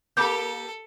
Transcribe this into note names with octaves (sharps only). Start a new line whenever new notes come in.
A#3 G4 A4 B5 D6 G6